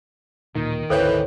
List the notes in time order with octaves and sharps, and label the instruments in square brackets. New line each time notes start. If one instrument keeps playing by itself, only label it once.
[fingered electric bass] D1 A#2 [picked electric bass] D#3
[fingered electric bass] G#1 D2 [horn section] E3 G5 [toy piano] A4 C5 C#5